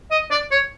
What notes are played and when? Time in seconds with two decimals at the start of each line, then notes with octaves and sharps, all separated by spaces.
0.11 D#5
0.31 D5
0.51 C#5